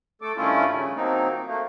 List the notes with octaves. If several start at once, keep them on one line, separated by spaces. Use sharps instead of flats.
A3 A4 D6
G2 D#3 A3 C#4 E4 F4
C#3
F3 F#3 A#3 C4 D#4
A3 A#3